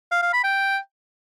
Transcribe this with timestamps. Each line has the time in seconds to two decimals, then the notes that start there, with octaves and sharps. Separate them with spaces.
0.11 F5
0.22 F5
0.33 B5
0.44 G5